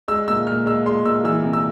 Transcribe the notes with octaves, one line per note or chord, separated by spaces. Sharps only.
G#3 E6
A#2 E6
A#2 F6
G#3 E6
G#3 C6
A#2 E6
E3 E6
C3
E6